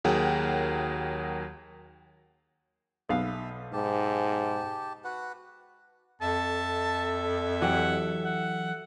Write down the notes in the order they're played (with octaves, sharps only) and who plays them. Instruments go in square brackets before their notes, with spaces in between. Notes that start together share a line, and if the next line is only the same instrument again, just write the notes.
[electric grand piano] D#2 F#3 G#4 A#4 F#5 G5
[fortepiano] B1 B3 F5 [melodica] E5
[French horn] G#2 [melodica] G4 A5
[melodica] F#4 B4 F#5
[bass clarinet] F2 [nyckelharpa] A4 E5 [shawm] A5
[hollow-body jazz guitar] E3 F#3 G4 [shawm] F#5
[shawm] F#5